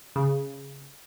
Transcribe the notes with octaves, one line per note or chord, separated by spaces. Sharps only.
C#3